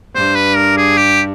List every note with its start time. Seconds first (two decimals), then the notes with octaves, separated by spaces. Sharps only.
0.15 G2 C5
0.35 B4
0.56 A#4
0.77 G#4
0.98 G4